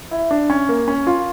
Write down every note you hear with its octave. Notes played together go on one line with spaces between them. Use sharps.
E4
D4
C#4
A#3
C#4
F4